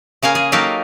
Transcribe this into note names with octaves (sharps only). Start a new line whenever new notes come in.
C#3 A#3 F5 G#5
G#4
F#3 A#3 D#4 G4 A4 F5